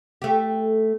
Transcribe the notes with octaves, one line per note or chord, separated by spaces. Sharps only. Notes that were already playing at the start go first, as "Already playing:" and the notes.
A3 G4